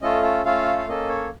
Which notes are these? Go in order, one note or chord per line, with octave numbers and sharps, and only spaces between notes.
A3 C#4 F4 A4 D#5
A4
A3 C#4 F4 A4 F5
F5
A#3 C#4 A4 D#5
C#5